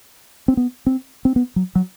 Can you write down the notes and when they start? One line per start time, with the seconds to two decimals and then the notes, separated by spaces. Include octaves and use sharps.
0.48 C4
0.57 B3
0.86 C4
1.25 C4
1.36 B3
1.56 F#3
1.75 F#3